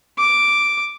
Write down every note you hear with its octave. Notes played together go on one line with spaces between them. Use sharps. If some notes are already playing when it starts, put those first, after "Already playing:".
D6